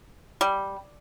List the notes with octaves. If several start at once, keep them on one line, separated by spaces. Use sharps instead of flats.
G3